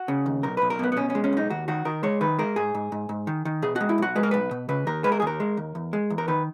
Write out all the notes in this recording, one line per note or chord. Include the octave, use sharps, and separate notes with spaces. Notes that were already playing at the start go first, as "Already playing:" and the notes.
Already playing: F#4
C#3
D#2
B1 A#4
B1 B4
A#4
B2 B3
B3
B2 C#4
C#4
G#3
C#4
B1 D#4
D#2 F#4
D#3 F#4
D#3 A#4
G#3 C#5
D#3 B4
G#3 A#4
G#2 G#4
G#2
G#2
G#2
D#3
D#3
B2 G#4
G#3 F#4
E4
B1 F#4
G#3 B4
A#4
B1 B4
B2
C#3 B4
D#2 A#4
G#3 B4
A#4
D#2 G#4
A#4
G#3
D#2
E2
G#3
E2
A#4
D#3 B4